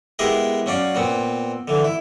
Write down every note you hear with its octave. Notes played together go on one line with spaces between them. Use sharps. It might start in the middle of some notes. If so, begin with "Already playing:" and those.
G#3 B3 E4 G4 G#4 A#4
F#3 C#4 D5 F5
A#2 B3 C4
D3 E3
E4